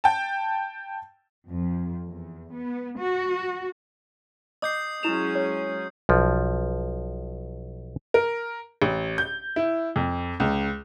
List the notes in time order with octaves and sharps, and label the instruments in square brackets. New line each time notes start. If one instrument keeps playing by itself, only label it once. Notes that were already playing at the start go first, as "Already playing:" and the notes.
[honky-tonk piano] G5 A5
[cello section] F2
E2
B3
F#4
[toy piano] D#5 D6 [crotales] D#6 G6 C7
[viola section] F#3 G#3 C#4 [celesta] E4 E7 F7
[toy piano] C#5
[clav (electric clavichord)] B1 F3
[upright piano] A#4
A1
G6
E4
F2
C#2